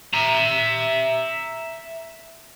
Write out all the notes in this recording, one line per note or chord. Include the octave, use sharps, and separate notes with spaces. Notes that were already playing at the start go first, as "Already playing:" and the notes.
E5 A#5